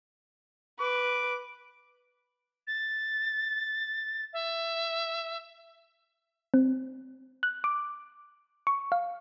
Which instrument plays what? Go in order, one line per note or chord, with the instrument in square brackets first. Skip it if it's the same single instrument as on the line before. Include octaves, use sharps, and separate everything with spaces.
[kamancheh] B4 [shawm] D6
[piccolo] A6
E5
[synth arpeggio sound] C4
F#6
D6
C#6
F5